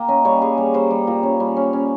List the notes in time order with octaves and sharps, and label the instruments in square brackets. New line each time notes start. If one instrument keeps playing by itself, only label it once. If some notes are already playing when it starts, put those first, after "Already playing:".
Already playing: [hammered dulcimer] A#3 G5
C#4 D#5
G3 C#5
G3 G#4
G3
G3 C5
G3
A#2
C#4
G3
C#4
C#4